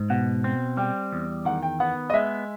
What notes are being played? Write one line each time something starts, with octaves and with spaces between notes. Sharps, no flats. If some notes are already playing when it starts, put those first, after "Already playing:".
Already playing: G#2
B2 F#5
C4
G3 G5
E2
D#3 F#5
G5
B3 F#5
D#5
G#3 E5